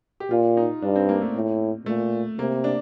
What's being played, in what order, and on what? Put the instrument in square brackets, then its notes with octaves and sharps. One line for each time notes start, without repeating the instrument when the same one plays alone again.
[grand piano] G4
[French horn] A#2 [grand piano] F4
[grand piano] D#4
[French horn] G2 [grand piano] D4
[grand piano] C4
A#3
A3
[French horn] A2
[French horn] A#2 [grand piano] A3
[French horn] C3 [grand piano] A#3
[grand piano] D4